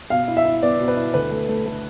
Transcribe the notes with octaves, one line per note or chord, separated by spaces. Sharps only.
B2 F5
E4
E5
E4
B3 D5
B2
B4
E4
D2 B4
A3
A3
A3